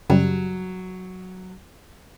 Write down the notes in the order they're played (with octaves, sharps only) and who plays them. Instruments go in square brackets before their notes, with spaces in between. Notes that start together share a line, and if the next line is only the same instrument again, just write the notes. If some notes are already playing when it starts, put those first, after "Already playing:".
[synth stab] F#2 C#3 G3 [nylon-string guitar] F#3